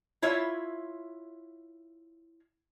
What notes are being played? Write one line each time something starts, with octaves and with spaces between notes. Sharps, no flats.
E4 F4 C#5 E5